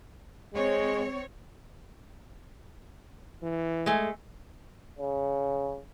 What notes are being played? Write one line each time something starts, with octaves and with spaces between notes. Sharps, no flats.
G#3 C4 C#5
E3
G#3 A3
C#3